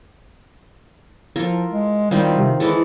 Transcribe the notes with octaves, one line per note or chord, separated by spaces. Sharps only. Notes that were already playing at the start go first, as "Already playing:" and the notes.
F3 F4 A4 A#4
G#3
D#3 G3 C4 F4
C3
E3 G#3 E4 A4